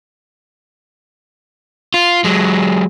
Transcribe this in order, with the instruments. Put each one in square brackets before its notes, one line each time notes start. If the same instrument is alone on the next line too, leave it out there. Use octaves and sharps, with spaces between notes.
[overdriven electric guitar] F4
F#3 G#3